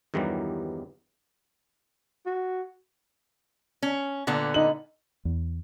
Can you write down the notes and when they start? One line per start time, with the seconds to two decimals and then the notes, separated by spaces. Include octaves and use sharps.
0.14 E2 G2 D#3 E3 F#3 G3
2.26 F#4
3.83 C#4
4.27 A#2 D3 B3
4.54 D#4 F#7
5.25 E2